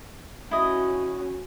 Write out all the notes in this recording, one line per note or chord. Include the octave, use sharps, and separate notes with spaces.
C#4 E4 F#4 D#5